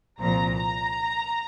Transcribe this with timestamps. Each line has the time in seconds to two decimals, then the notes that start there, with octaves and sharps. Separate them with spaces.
0.20 C2 A#2 F3 A#5
0.56 A#5